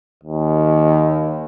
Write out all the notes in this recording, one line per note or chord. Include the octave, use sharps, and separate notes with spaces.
D#2